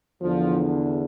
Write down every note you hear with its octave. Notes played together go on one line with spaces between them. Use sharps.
E2 D3 F3